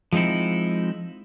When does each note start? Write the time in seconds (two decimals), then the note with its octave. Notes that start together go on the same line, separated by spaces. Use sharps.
0.12 F3 G#3 C4 D#4 E4